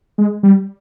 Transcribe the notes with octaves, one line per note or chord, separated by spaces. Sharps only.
G#3
G3